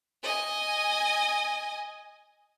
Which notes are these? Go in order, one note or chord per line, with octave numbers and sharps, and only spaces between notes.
D#5 G#5